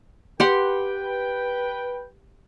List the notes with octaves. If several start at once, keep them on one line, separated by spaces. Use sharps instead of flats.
G4 B4 F#5 G5 C6